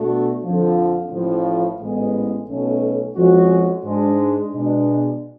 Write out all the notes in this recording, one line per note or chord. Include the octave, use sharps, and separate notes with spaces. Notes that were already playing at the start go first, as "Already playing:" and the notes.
Already playing: B2 A3 D4 F#4
F2 D3 F3
A1 A2 F3
A1 G#2 G#3 B3
B1 B2 A3 C#4
F2 F3 G#3 C#4 F#4
G#2 G#3 D4
B2 G#3 D4